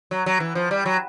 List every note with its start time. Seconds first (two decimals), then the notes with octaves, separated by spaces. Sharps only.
0.11 F#3
0.26 F#3
0.40 E3
0.55 F3
0.71 G3
0.86 F#3